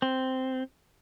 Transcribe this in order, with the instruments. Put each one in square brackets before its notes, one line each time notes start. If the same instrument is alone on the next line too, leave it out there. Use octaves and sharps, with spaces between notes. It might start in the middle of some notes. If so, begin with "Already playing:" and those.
[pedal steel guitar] C4